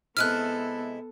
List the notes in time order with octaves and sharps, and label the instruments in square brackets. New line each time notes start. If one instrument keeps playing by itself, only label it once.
[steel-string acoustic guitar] C3 G#3 E4 [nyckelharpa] B3 A4 [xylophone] F6 F#6